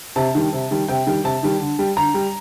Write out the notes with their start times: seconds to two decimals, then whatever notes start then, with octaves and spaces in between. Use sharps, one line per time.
0.16 C3 A5
0.35 D#3 G3
0.53 C3
0.71 D#3 G3
0.88 C3 G5
1.07 D#3 G3
1.24 C3 A5
1.43 D#3 G3
1.60 D3
1.79 G3
1.97 D3 A#5
2.14 G3